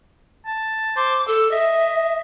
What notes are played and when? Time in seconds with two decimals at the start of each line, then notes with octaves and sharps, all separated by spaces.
0.46 A5
0.96 C5 D6
1.28 A4 E6
1.51 D#5 E5